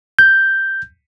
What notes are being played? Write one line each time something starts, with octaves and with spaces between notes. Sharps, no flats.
G6